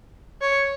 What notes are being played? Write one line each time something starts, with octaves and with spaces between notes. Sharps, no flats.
C#5